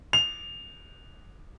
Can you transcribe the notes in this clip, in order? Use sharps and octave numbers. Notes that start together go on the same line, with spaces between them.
F7